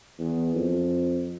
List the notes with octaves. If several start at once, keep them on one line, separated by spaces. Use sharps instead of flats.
E2
F2